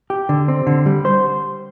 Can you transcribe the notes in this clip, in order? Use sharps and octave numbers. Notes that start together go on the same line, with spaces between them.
G4
D3
C4
D3
G3
C5